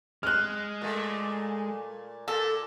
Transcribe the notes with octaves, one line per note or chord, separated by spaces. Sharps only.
G#3 F6 F#6
A#2 A3
A#2 A4